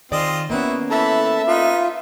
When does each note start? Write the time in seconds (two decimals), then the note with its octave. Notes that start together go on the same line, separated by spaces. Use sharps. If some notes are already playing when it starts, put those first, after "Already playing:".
0.12 D#3 C4 F4 G#4 D5 D#5
0.50 A#3 B3 C#4 E4 F#4
0.90 E3 A4 E5 A5 B5
1.47 D#4 F4 B4